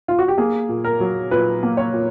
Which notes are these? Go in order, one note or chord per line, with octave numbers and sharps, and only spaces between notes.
F4
F#4
G4
A#3 G#4
A#2
A#4
F#3
A#2 B4
A#3
C#5
A#2